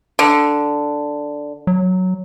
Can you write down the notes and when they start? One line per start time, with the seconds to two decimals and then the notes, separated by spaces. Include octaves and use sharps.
0.19 D3
1.67 F#3